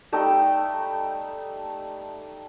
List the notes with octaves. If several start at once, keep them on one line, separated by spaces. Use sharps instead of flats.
G3 A3 D#4 G5